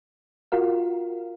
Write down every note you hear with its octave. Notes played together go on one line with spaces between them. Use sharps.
F4 F#4 A#4 F5